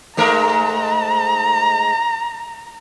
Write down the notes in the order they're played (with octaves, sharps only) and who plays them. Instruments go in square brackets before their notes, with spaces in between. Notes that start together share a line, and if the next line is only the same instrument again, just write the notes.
[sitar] G#2 A3 A#4 [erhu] A#5